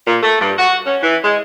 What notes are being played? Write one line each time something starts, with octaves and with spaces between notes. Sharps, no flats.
A#2
A3
G2
F#4
C#4
E3
G#3